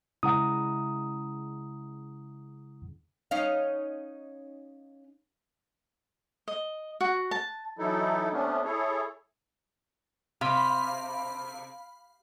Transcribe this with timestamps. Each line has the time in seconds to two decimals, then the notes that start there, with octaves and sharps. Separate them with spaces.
0.23 C#3 G#3 E4 F#5 A#5 D#6
3.31 C#4 D#4 F5
6.48 D#5
7.01 F#4
7.31 A5
7.79 E3 F#3 D#4 E4 A4
8.32 C3 A3 B3 C#4 D4
8.64 E4 G#4 A4 C#5
10.41 C3 F5 B5